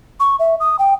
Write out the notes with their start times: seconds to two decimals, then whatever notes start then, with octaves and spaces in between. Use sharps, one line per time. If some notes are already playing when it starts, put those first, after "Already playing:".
0.20 C#6
0.40 E5
0.60 D#6
0.79 G5